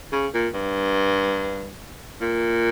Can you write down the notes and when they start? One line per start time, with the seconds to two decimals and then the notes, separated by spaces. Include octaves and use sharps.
0.12 C#3
0.34 A#2
0.54 G2
2.21 A#2